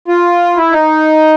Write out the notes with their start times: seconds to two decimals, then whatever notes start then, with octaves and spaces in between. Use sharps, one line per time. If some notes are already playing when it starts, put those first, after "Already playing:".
0.08 F4
0.57 E4
0.72 D#4